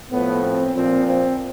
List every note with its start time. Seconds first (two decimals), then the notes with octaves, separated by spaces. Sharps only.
0.11 A2 F3 B3
0.43 C4
0.75 A#2 F3 C4
1.07 C4